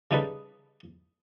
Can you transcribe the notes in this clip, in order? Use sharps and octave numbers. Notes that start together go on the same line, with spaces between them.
C#3 G3 D#4 A4 B4